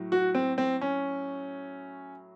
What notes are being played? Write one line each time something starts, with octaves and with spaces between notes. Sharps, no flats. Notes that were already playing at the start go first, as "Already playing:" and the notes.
Already playing: A2 F#3
F#4
C4
C4
C#4